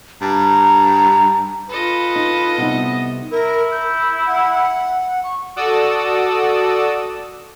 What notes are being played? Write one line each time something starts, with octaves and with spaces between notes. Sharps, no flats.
G2 A#5
F4 A4 B4 D#5
D#4
C3 G3 B3 D#4
E4 A#4
G6
F#5
C#6
F#4 A4 D5 D#6 E6